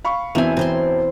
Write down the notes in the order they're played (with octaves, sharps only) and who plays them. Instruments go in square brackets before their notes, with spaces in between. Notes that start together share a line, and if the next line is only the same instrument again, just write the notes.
[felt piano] F5 B5 C#6
[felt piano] E1 C4 E5 [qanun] E3 G#5
[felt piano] E1 [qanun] C4 C5 C6